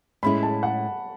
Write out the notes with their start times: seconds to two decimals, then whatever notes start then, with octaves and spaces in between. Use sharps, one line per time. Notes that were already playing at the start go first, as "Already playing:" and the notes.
0.23 A2 G#3 C#4 E4 B5
0.43 A5
0.63 F#5